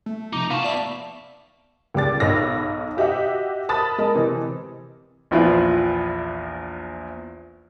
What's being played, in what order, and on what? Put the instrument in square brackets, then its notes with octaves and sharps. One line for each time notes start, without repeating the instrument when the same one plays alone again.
[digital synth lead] A3
[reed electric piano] C3 F3 D6 [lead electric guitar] D#4
[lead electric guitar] B3 A5 [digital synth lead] F4 [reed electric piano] F5 C#6
[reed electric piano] D5 E5 [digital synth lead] B6
[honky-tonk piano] C#2 G3 D6 A6
B1 D#4 C#5 B5 E6 A#6
F#4 G4 D#5 E5 F#5
A5 B5 D#6 A6
G#3 A#4 D#5
C3 E3 C4
[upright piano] A#1 E2 F3 E4 F4 B4